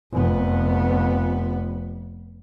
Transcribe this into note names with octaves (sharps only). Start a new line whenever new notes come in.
F1 B3